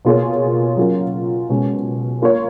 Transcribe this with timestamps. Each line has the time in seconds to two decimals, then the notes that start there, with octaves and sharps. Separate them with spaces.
0.05 B2 A#3 F4 G#4 C#5
0.77 F#3 C#4 F4 A#4
1.49 B2 G#3 C#4
2.22 A#3 F4 A#4 C#5